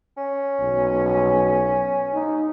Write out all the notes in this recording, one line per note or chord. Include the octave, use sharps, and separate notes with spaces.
C#4
B1
D#4